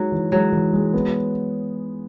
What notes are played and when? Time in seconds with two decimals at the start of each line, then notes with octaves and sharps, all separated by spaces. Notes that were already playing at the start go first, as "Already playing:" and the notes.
Already playing: F#3 G#3 D#4
0.12 E3
0.32 F#3 G#3
0.53 E3
0.73 G#3
0.93 B3